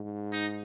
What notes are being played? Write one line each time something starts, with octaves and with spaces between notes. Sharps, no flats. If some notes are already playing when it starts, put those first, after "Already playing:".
Already playing: G#2
D#4